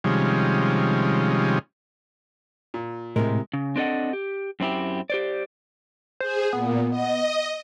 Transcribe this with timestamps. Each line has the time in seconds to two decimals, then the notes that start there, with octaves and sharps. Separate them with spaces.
0.04 C3 D#3 F3 G3 G#3 C#4
2.74 A#2
3.16 A2 C3 G#3 E4 A#4
3.54 C#3
3.76 C4 D4 A4 D#5 F#5
4.13 G4
4.60 F#2 C4 E4 G4
5.10 G4 C5 D5
6.20 G#4 C5
6.53 A#2 B3
6.90 D#5